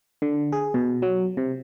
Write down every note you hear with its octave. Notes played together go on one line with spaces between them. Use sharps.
D3
G#4
B2
F#3
C3